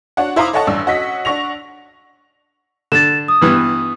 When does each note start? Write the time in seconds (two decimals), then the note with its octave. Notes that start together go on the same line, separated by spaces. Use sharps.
0.17 D4 F#4 C#5 F#5
0.36 E4 C5 F5 A#5 D6 D#6
0.53 A4 C#5 D#5 F#5 A5 C#6
0.67 A1 G2 D4 E6
0.86 C#4 F#4 D#5 B6
1.25 D4 F#5 C#6 A#6 F7
2.92 D3 A6 E7
3.28 D#6
3.41 G2 E3 B3